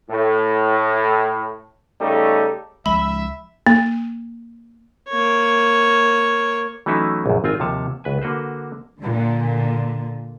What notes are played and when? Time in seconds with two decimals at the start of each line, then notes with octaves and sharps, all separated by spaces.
0.10 A2
2.00 C#3 G3 A3 D#4 G4 A4
2.86 C#2 F3 G#3 E5 B5
3.67 A#3
5.09 A#3 C#5
6.86 E3 F#3 A3 C#4 D#4 E4
7.26 A#1 F#2
7.44 G#1 C4 F4 G#5
7.60 D#2 C3 F3 C#5 A5
8.04 C#2 B4 G#5
8.22 D3 A#3 F#4 B4 C5
9.01 A#2 D3